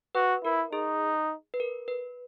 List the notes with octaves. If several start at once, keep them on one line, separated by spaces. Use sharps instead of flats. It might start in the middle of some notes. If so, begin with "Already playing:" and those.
F#4 B4
E4 A#4
D#4 G#4
B4
A#4
B4